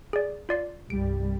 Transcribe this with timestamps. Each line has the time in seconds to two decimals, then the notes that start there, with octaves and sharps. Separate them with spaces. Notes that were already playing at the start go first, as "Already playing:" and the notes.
0.13 G#4 D5
0.49 F4 D5 C7
0.90 C2 G2 G3 D7